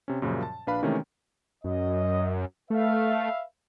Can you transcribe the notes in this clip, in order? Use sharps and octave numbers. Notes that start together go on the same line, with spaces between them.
C3 C#4
F#2 A#2 C#3 F3 G3
A5
A#1 D4 B4 F5 B5
C3 D#3 E3 G#3 A3 C#4
F#2 D#5
A3 B4 E5 F5